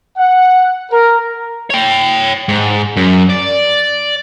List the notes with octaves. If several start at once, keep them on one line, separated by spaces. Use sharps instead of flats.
F#5
A#4
C#5 G5
G#2
F#2
D5